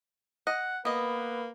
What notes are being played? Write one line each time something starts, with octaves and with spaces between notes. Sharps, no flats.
D#5 F#5
A#3 B3 B4 D#5